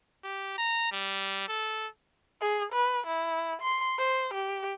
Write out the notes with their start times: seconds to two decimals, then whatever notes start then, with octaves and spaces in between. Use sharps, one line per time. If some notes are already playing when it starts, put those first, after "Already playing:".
0.24 G4
0.58 A#5
0.92 G3
1.48 A4
2.41 G#4
2.73 B4
3.07 E4
3.62 C6
3.98 C5
4.34 G4